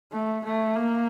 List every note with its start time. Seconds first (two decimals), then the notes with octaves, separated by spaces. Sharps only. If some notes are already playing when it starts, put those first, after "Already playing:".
0.13 A3
0.45 A3
0.76 A#3